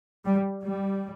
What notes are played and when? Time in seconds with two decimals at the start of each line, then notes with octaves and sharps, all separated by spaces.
0.25 G3
0.63 G3